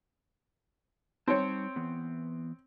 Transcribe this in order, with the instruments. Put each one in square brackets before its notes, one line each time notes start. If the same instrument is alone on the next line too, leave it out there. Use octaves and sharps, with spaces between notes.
[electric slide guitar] G3 D#4 A5 [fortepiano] C4 C#5
[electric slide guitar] E3 B3